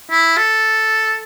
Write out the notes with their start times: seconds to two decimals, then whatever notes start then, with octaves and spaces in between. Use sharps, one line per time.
0.11 E4
0.37 A4